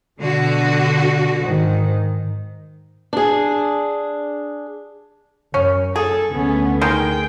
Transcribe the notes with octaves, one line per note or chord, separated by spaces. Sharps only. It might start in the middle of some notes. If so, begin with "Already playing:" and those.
B2 D3 F#4
G#2 D#3
D4 G#4
F#2 C#4
G#4 A4
D2 A3 B3 C#4
D#3 G#3 G#4 G5